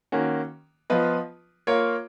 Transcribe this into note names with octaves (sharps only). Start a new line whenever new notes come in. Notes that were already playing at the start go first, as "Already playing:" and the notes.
D#3 A#3 C#4 F#4
F3 B3 F4 B4 D#5
A#3 F4 A#4 C#5